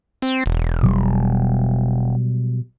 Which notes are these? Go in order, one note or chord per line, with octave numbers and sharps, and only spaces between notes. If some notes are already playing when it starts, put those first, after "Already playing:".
C4
E1
B2 F#3 G3